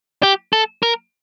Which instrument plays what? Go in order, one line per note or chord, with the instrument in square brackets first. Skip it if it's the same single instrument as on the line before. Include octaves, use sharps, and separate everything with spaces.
[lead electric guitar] G4
A4
A#4